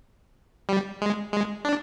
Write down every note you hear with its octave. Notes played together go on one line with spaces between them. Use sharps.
G3
G#3
G#3
D4